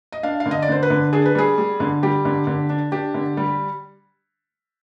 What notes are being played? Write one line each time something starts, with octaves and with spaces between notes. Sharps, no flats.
D#5
D4 F5
F5
D3
D#5
D5
D3 C5
B4
D3
D4 G#4
B4
G3 G#4
G3
D3
G3 G4
D3
D3
D4
D4 G4
D3
G3